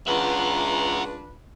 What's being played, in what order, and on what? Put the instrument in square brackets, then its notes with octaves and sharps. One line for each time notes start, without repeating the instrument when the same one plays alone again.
[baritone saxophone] C#2 [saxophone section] D4 F4 B4 [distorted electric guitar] E5 F#5 [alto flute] A#5